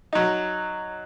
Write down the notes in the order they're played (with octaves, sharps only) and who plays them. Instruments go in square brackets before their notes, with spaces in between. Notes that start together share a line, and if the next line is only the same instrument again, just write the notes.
[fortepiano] F#3 D#4